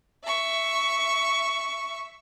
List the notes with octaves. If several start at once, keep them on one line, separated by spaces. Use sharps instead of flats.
E5 C#6